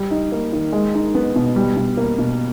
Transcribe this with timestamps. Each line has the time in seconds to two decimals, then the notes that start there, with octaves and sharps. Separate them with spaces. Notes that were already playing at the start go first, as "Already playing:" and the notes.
Already playing: G3
0.11 D#4
0.32 A#3
0.53 D#3
0.73 G#3
0.95 D#4
1.15 B3
1.36 B2
1.56 G3
1.77 B2
1.97 A#3
2.18 B2